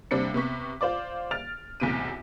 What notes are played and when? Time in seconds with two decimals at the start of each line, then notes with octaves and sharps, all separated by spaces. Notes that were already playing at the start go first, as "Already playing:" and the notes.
0.11 D#2 C3 G3 C4 D4 C#7
0.34 C3 B3 C#6 B6
0.81 F4 C5 D5 D6
1.31 F6 A6 D7 F7
1.80 B1 E2 A2 C3 D7 D#7